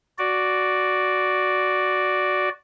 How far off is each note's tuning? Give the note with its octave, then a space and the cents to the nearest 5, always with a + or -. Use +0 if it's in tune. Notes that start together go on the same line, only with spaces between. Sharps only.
F#4 +0 D5 +0